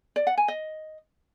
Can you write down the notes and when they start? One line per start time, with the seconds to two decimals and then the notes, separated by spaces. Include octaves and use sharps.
0.16 D5
0.27 F#5
0.37 G#5
0.48 D#5